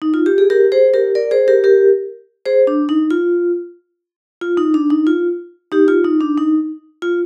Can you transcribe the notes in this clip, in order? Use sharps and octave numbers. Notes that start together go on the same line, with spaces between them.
D#4
F4
G4
G#4
G4 A#4
G#4 C5
G4 A#4
A#4 D5
G#4 C5
G4 A#4
G4 A#4
G#4 C5
D4
D#4
F4
F4
D#4
D4
D#4
F4
D#4 G4
F4
D#4
D4
D#4
F4